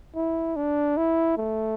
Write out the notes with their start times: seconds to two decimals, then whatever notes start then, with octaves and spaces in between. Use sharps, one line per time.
0.16 E4
0.56 D4
0.97 E4
1.37 A3